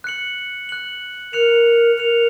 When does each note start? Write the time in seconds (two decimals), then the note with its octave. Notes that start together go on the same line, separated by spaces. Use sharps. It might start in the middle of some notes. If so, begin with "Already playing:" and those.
0.04 F#6 C#7 F#7
0.69 F#6 C#7 F#7
1.33 A#4 F#6 C#7 F7
1.98 A#4 F#6 C#7 F7